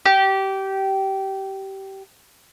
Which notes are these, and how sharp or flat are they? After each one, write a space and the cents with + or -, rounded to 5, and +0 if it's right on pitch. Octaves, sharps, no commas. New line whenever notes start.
G4 -20